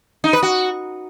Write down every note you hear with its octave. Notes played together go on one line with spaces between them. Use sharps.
D#4
B4
F#4